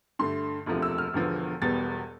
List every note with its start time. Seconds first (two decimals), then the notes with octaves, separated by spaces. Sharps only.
0.19 G2 D3 A3 C6
0.66 E1 D2 C3 F3 A3
0.82 E6
0.98 F6
1.13 E1 E2 D3 F3 B3
1.61 E1 E2 B2 G3 B3 A6